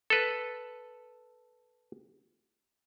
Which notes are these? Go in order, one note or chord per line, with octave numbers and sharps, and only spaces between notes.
A4 B4